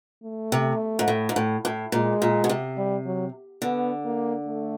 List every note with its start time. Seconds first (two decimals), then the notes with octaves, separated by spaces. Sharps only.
0.24 A3
0.52 C3
0.99 G#2
1.08 A2
1.29 G#2
1.36 A2
1.65 A2
1.92 A#2 G#3
2.22 A#2
2.44 B2
2.49 C3
2.77 G3
3.06 F#3
3.62 D3 B3
4.05 A#3
4.47 A3